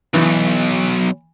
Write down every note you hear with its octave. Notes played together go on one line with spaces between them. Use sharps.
B1 E3